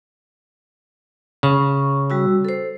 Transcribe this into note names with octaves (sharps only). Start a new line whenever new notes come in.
C#3 C#6
G3 F#4 E6
A4 C5